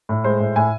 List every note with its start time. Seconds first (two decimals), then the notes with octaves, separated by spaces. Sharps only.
0.09 A2
0.24 G#3 C5
0.40 A2
0.56 A2 G#5